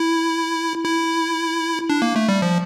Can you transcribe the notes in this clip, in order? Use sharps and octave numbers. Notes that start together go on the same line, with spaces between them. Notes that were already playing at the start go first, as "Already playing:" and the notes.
Already playing: E4
E4
D4
A#3
A3
G3
F3